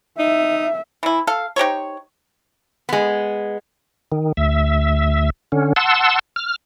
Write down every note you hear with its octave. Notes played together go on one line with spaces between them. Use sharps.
D#4 E5
E3 E4
A4 F5
D#4 G4 C5 C#5
G#3 B3
D#3
D2 E5
D3 C#4
F#5 A5 C6 E6
F6